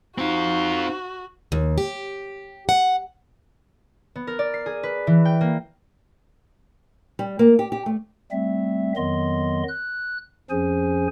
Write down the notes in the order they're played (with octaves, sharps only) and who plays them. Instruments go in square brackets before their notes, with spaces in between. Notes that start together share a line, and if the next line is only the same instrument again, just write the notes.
[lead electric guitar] C4 F4 [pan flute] D#4 [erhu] F#4
[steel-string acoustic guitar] D#2
G4
F#5
[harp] B3
A#4
D5
C7
G#4
B4
E3
G5
A#3
[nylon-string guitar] G3
A#3
G4
G4
A3
[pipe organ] G3 A3 C4 E5
F2 D#3 F#3 B3 D#5 C6
F#6
F2 F3 C#4 G#4 C5 G#5